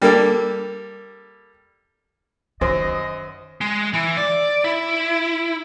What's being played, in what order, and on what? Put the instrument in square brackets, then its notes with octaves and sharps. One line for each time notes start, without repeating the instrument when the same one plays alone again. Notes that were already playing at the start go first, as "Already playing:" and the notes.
[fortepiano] G3 A#3 A4
[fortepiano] F#2 [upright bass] D#3 [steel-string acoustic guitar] C5 [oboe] D#5
[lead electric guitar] G#3
E3
D5
E4